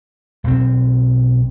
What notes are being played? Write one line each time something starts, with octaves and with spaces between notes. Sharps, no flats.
B1 F3 C4